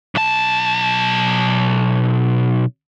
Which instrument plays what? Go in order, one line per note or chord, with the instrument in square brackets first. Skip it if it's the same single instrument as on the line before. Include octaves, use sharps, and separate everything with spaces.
[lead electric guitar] B1 A5